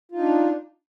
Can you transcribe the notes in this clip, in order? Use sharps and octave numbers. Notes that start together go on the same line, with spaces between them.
D4 D#4 F4